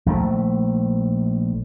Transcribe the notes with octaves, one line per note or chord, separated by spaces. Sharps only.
A#1 D#3 A3